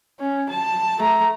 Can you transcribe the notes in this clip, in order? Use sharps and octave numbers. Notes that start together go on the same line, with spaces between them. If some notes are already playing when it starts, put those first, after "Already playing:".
C#4
A5
A3 A#5